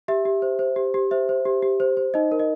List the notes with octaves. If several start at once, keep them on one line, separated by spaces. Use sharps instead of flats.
G4 E5
G4
C5
C5
G4
G4
C5 E5
C5
G4
G4
C5
C5
D#4 D#5
A#4
D#5